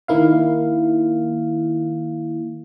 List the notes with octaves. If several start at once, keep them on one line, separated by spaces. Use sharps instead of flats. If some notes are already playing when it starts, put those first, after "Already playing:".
D#3 A#3 E4 F5